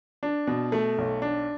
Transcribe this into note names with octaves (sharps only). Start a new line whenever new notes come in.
D4
B2
A3
B1
D4